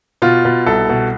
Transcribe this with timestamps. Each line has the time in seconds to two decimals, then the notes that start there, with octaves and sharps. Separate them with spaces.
0.22 B2 F4
0.45 B2
0.66 C2 A4
0.89 B2